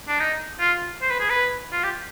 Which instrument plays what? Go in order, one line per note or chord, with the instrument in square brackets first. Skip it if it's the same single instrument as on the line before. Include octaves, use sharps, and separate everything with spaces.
[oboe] D4
D#4
F4
C5
B4
G#4
B4
F4
G4